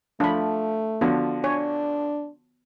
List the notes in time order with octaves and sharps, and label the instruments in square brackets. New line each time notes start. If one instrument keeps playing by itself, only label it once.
[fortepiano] F3 [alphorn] A3 [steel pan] D4 B5
[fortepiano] D3 F3 F#4 [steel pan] B3
[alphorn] D4 [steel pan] C#5 G#5